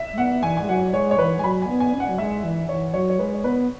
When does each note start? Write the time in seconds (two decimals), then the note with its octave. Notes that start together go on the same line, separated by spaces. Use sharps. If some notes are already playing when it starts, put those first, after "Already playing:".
Already playing: E5
0.13 G#3
0.18 B3 F#5
0.43 E3 G#5
0.57 G#3 G#5
0.69 F#3 F#5
0.93 G#3 C#5
1.11 C#5
1.18 E3 B4
1.38 G#3 G#5
1.44 F#3 B5
1.62 G#5
1.68 B3
1.80 G#5
1.93 C#4
2.00 F#5
2.09 F#3
2.18 G#3 E5
2.44 E3
2.69 E3 C#5
2.94 F#3 C#5
3.10 C#5
3.19 G#3 B4
3.34 C#5
3.44 B3 B4